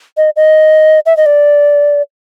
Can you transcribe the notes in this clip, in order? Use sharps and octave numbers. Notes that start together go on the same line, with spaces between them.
D#5
D#5
E5
D#5
D5